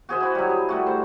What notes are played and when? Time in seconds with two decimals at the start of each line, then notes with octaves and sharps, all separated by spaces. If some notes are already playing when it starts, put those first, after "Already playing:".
0.09 F#4 G#4 C5 E5
0.20 E4 F#4
0.35 F#3 G3
0.49 G#4
0.69 G3 A3 F#4
0.86 C5